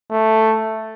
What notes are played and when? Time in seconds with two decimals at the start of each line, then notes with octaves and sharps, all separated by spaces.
0.11 A3